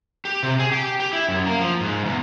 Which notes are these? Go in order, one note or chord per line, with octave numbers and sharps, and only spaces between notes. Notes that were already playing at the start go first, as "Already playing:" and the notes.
G4
C3
G#4
G4
G4
E4
F#2
A#3
F3
G#2
E2